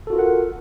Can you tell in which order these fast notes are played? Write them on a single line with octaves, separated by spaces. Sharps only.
A4 F#4 F4 A#4 F#5